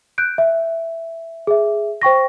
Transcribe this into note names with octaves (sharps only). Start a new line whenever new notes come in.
F#6 G6 D7
E5
G#4 E5
C5 G5 C#6 A#6